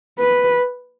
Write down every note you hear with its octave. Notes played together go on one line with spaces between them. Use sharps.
B4